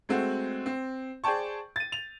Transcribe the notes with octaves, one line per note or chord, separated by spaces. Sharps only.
G#3 A3 C4 F#4
C4
G#4 C5 D5 G5 A5 C#6
A6 D#7
F7